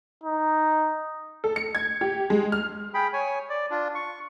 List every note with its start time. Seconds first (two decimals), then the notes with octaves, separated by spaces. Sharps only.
0.23 D#4
1.44 A4
1.56 C#7
1.75 G#6
2.01 G4
2.30 G#3
2.52 F6
2.94 G#4 G5 B5
3.13 C#5 G#5
3.50 D5
3.71 D4 F4
3.95 C#6